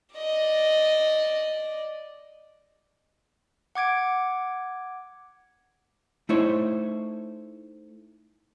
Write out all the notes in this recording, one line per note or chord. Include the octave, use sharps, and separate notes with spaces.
D5 D#5
F#5 D6 G#6 D7
A3 D#4 E4 C5 C#5